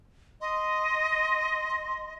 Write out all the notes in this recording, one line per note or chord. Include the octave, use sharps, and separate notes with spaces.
D#5 C6